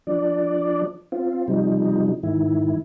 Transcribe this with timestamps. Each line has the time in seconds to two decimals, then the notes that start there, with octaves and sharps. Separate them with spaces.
0.07 F3 D4 D5
1.12 C4 F4
1.48 C3 F3 G3 D#4
2.23 G#2 D#3 E4